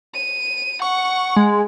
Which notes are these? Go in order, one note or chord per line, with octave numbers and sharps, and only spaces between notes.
D#7
F#5 C#6
G#3